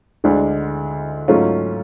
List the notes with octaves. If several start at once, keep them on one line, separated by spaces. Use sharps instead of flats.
D2 D3 G#3 D4
G#2 F#3 A3 C#4 F4